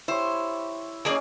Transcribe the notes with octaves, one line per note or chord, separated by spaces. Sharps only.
E4 G4 C5 C#5
A#3 C#4 G#4 D5 D#5 D6